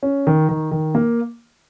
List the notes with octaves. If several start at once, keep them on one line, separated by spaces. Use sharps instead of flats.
C#4
D#3
D#3
D#3
A#3